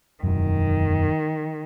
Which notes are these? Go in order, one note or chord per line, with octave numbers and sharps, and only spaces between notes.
E1 F#2 D#3